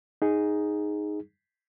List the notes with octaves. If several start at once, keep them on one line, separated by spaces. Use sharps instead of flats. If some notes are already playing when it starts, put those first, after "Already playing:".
D#4 G#4